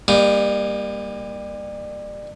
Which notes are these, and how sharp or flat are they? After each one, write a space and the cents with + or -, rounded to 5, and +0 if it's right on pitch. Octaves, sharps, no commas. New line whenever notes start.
G3 +30 A#3 +15 D#4 -5